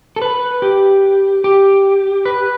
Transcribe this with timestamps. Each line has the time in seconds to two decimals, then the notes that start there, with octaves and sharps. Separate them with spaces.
0.16 A4
0.22 B4
0.62 G4
1.44 G4
2.25 B4